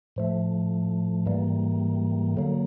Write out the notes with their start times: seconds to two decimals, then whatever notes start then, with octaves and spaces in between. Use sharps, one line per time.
0.16 A2 F3 A3
1.26 G#2 E3 G3 A#3
2.37 D3 F#3 A#3